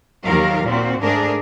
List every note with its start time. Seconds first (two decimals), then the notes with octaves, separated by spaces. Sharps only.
0.24 D#2 D#3 F3 F#3 A#4 F5
0.63 A#2 C4 F#4
1.01 G#2 A3 D4 G#4 A#4